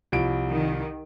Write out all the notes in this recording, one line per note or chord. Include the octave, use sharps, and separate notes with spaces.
C2 F3 D7
D#3